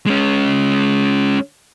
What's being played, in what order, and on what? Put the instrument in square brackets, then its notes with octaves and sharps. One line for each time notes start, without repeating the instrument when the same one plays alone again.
[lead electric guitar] G#3 C#4